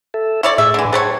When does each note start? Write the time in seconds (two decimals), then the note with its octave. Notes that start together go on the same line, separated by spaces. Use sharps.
0.14 A4 E5
0.43 E4 C#5 D5
0.58 A2 G#4 E5
0.74 D3 E3
0.93 F#3 G3 G#4 C5 C#5 A5